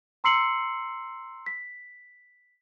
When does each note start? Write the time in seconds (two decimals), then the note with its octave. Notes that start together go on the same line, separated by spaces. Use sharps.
0.24 A#5 C6 E6 C7 C#7 F#7
1.46 B6